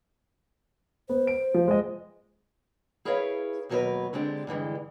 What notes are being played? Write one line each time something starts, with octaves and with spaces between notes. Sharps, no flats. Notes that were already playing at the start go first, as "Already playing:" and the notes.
B3 C5
D7
F3
G#3 D#5
E4 G#4 A#4 B4 C#5 F5
D#2 B2 F#3 F4 A#4 B4
D3 G#3 C4 D4 G4
G2 D3 E3 G#3